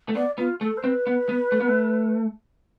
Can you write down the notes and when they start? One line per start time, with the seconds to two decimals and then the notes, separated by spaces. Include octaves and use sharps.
0.09 A3
0.15 B3 D5
0.38 B3 F4
0.60 A3 A4
0.77 C5
0.84 C4 B4
1.07 B3
1.29 B3
1.52 A3
1.60 B3
1.68 A3